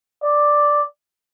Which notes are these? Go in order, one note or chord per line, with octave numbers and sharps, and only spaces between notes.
D5